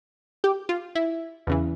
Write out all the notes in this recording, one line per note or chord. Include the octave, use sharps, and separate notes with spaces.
G4
F4
E4
E2 C#3 E3